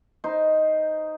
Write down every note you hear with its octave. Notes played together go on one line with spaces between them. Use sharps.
D#4 C5